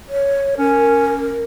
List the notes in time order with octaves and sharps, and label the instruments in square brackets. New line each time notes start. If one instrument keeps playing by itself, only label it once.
[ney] C#5
[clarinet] C#4 [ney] A#4